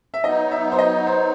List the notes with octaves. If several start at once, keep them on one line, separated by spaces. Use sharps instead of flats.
E5
F#3 B3 D#4 D#5
E5
C5
D#5
C5